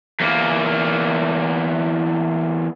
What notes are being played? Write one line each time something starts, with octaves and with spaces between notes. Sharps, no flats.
E2 A#3